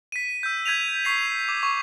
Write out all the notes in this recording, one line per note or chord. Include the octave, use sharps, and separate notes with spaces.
B6 D#7
E6 G6
G6 G#6 B6 D#7 F7
C#6 B6 C7 F7
D6
C#6